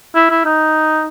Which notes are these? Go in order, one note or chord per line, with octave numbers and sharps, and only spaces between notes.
E4
E4
D#4